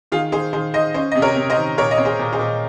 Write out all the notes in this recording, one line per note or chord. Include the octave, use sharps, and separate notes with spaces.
D#3 F4 G#4
D#3 G#4 C5
D#3 G#4 C5
D#3 C5 D#5
C#4 C5 D#5
C3 D#5
A#4 C#5
C3
C5 D#5
D#3
A#2 A#4 C#5
D#5
C4 C#5
G#4 C5
A#2
G#4 C5
A#2